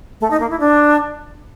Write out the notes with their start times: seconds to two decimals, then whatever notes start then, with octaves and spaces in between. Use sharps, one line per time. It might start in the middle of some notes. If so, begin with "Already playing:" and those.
0.21 A3
0.30 D#4
0.40 A#3
0.50 E4
0.60 D4